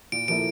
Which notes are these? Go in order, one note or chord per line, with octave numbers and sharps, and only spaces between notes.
A#2 D7
F3 A#3 E4 A4 D7